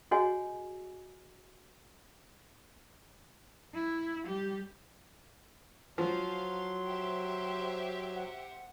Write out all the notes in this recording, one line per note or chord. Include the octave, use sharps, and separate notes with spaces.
F#4 G#4 C#5 D#5 F#5 G#5
E4
G3 G4
F3 F#3 F5 C6
G4 C5 E5
F#5